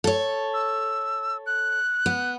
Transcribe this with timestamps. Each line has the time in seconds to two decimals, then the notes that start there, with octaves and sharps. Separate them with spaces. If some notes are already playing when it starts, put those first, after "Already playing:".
0.04 A4 C#5
0.54 E6
1.46 F#6
2.06 B3